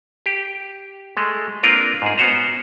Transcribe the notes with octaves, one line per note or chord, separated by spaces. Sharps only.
G4
G#3 A3
A#3 C4 D4 F4 A#4 B4
G#2 G#4
B3 C#4 F#4 C5 A#5